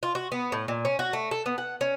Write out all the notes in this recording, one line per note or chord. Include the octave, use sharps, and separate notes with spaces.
F4
F#4
B3
A2
A#2
C#4
F#4
A3
A4
B3
F#5
C#4